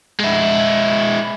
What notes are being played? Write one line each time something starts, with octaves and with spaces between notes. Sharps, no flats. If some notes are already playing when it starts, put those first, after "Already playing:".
G#3 E4